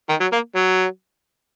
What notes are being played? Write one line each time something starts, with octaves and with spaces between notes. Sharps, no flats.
D#3
F#3
A#3
F#3